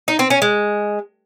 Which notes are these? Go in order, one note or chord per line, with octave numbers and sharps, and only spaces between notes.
D#4
C4
C#4
G#3